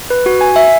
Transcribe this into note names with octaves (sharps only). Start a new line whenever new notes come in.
B4
F#4
G#5
E5